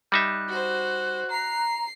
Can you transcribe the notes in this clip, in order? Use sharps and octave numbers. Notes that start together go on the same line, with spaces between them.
G3 D#4 E5 F#6
F#4 C5
A#5 C7